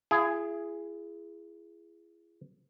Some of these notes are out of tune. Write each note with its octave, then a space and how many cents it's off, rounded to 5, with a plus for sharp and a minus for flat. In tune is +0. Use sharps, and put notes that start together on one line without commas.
E4 +40 G#4 +0 F5 +15